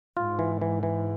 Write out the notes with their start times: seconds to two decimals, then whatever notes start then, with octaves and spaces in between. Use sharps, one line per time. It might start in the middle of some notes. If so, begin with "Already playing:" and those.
0.17 G#2 F4
0.39 E3
0.61 E3
0.83 E3